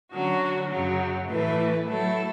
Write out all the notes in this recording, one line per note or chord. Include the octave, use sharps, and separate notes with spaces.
D3 F#3 C#4 F#4
F#2 C#3 F#3
A2 E3 A3 E4 B4
F#3 A3 E4 A4